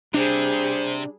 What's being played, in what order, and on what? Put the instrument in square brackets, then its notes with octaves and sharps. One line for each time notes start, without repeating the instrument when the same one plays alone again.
[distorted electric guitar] C3 [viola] G3 G#4 [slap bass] D4 [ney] C5